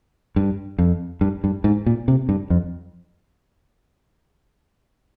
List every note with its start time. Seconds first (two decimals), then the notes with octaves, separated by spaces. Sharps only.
0.36 G2
0.78 F2
1.21 G2
1.44 G2
1.64 G#2
1.86 A#2
2.08 C3
2.29 G2
2.50 F2